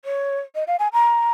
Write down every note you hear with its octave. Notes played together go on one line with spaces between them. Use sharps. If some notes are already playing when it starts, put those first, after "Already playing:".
C#5
D#5
F5
G#5
A#5